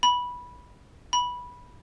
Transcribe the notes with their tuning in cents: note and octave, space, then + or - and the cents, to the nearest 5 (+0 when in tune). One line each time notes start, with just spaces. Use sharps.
B5 -10
B5 -10